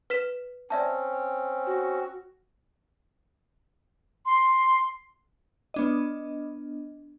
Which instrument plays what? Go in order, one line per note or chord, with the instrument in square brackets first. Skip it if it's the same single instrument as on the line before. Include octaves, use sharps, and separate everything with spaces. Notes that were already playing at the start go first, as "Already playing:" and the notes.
[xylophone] B4 B6 E7
[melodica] C4 C#4 [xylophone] D5 E5 A5
[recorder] F#4
[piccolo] C6
[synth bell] B3 D4 D#5